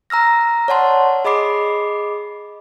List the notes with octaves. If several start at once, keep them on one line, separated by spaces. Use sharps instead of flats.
A#5 E6 F6 A#6
C#5 D5 F#5 A5 C6
G#4 D#5 B5 D6 C7